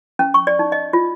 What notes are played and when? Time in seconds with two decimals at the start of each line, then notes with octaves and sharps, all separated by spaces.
0.19 C#4
0.34 C#6
0.47 D5
0.59 D#4
0.72 D#5
0.93 F4